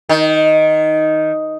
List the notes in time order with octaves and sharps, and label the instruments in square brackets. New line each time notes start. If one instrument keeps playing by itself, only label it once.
[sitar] D#3